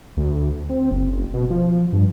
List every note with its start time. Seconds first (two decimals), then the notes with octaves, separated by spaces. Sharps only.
0.17 D2
0.69 C4
0.91 F#1
1.34 B2
1.50 F3
1.93 G2